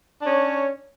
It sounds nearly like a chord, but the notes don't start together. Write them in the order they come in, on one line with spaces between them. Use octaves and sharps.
D4 C#4 C#5